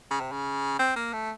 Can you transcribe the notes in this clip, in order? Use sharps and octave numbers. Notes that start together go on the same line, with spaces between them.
C#3
C3
C#3
C4
A#3
A3